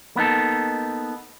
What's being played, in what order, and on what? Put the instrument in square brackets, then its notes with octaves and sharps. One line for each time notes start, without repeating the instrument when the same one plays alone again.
[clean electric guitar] A#3 B3 D#4 A4